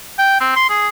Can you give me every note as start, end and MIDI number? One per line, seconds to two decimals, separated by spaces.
0.19 0.38 79
0.41 0.54 60
0.56 0.67 84
0.70 0.89 68